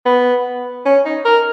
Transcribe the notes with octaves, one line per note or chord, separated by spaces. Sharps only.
B3
C#4
D#4
A#4